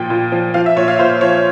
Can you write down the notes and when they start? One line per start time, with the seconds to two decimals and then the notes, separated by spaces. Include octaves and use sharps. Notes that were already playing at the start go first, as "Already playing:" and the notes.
Already playing: A#2 F3 G5
0.10 A#2
0.32 F3
0.54 F3 F5
0.66 E5
0.76 A#2 C#5
0.88 F5
0.99 A#2 C5
1.21 F3 C#5